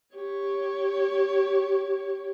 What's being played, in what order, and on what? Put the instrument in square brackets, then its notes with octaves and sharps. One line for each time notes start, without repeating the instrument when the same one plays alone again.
[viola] G4 C#5